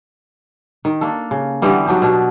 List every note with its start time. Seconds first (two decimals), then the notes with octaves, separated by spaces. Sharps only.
0.85 D#3
1.01 A#3 D4 A4
1.31 C#3
1.62 D3 E3 G3 B3
1.86 F#3 D4 D#4 G4
2.02 B2 D4